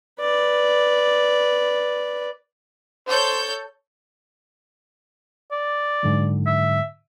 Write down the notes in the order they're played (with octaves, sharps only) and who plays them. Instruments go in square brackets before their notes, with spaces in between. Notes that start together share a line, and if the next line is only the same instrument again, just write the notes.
[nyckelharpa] B4 D5
[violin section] A4 C#5 G6 [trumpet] C5
[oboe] D5
[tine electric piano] G#2 D3 F#3
[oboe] E5